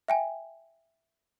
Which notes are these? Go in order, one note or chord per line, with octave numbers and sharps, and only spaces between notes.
E5 G5 G#5